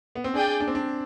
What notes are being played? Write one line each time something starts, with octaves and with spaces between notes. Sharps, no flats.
B3
C4
D4 G#4 D5 G5
D4
C4
D4